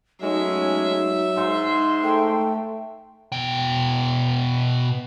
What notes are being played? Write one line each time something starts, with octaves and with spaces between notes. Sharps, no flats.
F#3 G#3 A3 C#4 D#4 E5
G#2 C6
A3 G5
B2 G5